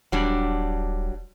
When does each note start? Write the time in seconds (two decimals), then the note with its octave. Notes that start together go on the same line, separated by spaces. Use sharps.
0.12 D#1 F#3 G3 D4